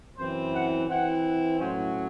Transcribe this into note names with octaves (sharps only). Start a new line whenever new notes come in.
F#2 E3 C4 E4 C5
F#5
E3 C4 E4 F#5
A2 F#3 C#4 C5